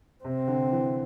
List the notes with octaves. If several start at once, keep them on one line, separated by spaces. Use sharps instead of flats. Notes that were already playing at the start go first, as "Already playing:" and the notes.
C3 C4
D3
E3